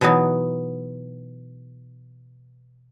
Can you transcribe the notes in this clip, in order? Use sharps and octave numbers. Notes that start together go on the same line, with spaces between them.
B2 E3 F#3 B3 D#4